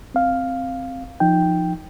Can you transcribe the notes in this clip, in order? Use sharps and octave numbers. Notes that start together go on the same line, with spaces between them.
C4 F5
F3 D#4 G5